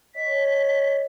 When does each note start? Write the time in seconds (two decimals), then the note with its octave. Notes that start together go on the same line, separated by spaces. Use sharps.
0.15 C#5 D#5 B6